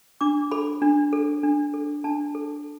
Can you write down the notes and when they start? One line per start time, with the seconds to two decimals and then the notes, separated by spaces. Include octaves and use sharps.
0.21 D4 D6
0.51 A4 B5
0.82 D4
1.13 A4
1.43 D4
1.74 A4
2.04 D4 A5
2.35 A4